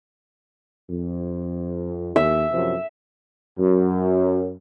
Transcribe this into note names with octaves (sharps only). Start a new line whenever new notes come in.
F2
D#2 E5
F#2 C3 F3
F#2